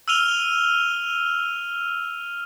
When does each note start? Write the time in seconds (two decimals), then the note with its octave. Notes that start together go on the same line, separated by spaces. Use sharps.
0.08 E6 F6 D#7 F7 G7